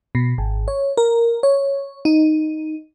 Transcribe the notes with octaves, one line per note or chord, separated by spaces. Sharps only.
B2
G#1
C#5
A#4
C#5
D#4